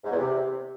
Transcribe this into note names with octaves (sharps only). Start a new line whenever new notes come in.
G#2
E2
C3